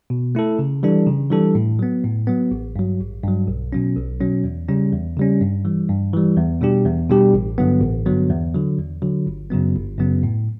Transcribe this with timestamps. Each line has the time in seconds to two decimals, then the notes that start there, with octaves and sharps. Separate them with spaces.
0.10 B2
0.35 A3 E4 A4
0.59 C#3
0.83 E3 G3 D4 A4
1.06 C#3
1.31 E3 G3 D4 A4
1.55 A2
1.79 F#3 B3
2.04 A2
2.27 F#3 B3
2.51 A1
2.76 G2 F#3
3.00 A1
3.23 G2 F#3
3.47 B1
3.73 B2 F#3 C#4
3.96 B1
4.20 B2 F#3 C#4
4.44 E2
4.69 C#3 G3 C#4
4.93 E2
5.17 C#3 G3 C#4
5.41 G2
5.65 E3 G3
5.89 G2
6.13 E3 G3
6.37 E2
6.61 B2 G3 D4 G4
6.85 E2
7.10 B2 G3 D4 G4
7.34 A1
7.58 G2 D3 F#3 B3
7.82 A1
8.06 G2 D3 F#3 B3
8.30 E2
8.54 D3 F#3
8.79 E2
9.02 D3 F#3
9.26 G1
9.50 F#2 C#3 F#3 B3
9.75 G1
9.99 F#2 C#3 F#3 B3
10.23 A2